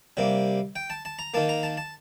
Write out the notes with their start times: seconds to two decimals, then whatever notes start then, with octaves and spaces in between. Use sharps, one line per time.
0.17 C3 G3 A#3
0.76 G5
0.90 A5
1.05 A5
1.19 A#5
1.34 D#3 A#3 A5
1.49 A#5
1.63 A5
1.77 A5